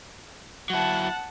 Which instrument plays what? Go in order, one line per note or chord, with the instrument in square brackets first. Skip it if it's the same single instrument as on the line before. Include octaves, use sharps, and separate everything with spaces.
[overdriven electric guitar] F#3 E4 [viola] F#5 A5